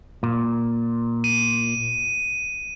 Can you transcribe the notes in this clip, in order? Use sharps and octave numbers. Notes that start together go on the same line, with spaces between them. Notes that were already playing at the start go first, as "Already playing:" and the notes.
A#2
D#7